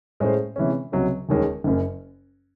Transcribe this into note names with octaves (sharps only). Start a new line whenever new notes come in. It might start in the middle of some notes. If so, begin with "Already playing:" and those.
A2 G#3 C#4 G#4 C5
C3 E3 G#3 C#4
C#2 C3 F#3
E1 D#2 D#3 G#3 C#4
F#1 F#2 C#3